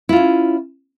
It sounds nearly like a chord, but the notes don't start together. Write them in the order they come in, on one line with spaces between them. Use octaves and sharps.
E4 F4 C#4